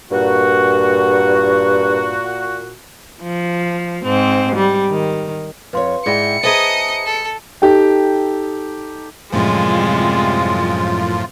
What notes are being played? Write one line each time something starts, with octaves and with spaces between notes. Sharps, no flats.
G2 A#2 F#4
F3
G#2 C4
G3
D#3
F2 B4 C#5 F5 C6
G#2 E4 G#4 D5 G5 A#6 C#7
G#4 B4 C5 D#5 E5 A5 A#5 D#6
A4
D#4 G4 A4 G5
F#2 A2 C3 F3 G3 G#3 F4